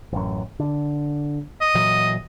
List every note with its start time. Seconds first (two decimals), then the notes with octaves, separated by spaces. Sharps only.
0.13 A1 F#2
0.60 D3
1.61 D#5
1.75 A#2 E3 F#3